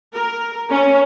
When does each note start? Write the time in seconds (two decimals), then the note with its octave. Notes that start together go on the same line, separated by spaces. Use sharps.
0.15 A#4
0.71 C#4